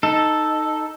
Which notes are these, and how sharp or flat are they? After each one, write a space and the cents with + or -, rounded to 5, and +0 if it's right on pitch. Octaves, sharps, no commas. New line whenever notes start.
D#4 +0 A4 +0